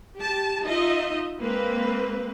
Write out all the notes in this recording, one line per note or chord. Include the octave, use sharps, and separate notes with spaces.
G4 A5
D#4 F4 D#5 E5
G#3 A#3 C4 B4